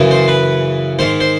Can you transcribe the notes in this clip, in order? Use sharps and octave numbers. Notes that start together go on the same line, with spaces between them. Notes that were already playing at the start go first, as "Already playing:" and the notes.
Already playing: F#2 C#3 E3
C5
B4
G#2 D#3 C5
C5